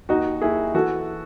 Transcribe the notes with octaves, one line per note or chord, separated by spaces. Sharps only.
D#2 D#4 F#4
D#2 E4 G#4
E3 F#4 A4